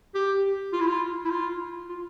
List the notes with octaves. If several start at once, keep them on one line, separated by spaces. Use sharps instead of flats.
G4
F4
E4
F4
E4
F4
F4